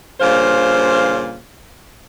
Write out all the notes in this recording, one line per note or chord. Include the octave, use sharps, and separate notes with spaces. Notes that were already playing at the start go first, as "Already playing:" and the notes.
G2 A#2 C#3 C5 F5